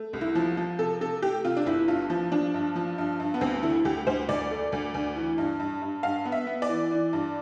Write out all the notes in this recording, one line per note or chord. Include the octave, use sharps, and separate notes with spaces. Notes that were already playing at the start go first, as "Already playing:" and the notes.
Already playing: A3
C2
E4
F3
F3
C3 A4
C3 A4
A3 G4
C3 F4
D4
G1 E4
G2 F4
F3
F3 D4
G2
F3
G2
G2
B3
D2 C4
D3 E4
D2 G4
D2 C5
D2 D5
A3
D2
D2
E3
G2
G2
G2
G2 F5
B3
E5
B3
D5
E3
E3
G2